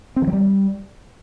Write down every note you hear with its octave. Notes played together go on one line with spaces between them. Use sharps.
C4
E3
F#3
G3